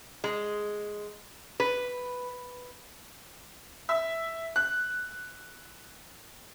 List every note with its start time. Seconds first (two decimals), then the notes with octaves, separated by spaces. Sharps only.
0.24 G#3
1.60 B4
3.89 E5
4.56 F#6